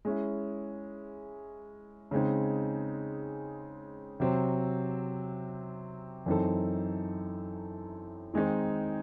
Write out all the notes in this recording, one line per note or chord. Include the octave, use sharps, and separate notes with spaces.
G#3 C#4 E4
C#3 G#3 C4 D#4
C3 F#3 C4
F#2 E3 C4 D#4 A4
D#3 G#3 C4 D#4